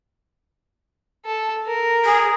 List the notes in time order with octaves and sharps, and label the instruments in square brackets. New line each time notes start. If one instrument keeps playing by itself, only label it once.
[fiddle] A4
A#4
[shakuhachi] G#4